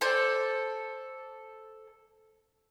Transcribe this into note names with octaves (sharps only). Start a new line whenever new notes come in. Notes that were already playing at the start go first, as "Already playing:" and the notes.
A4 C5 D5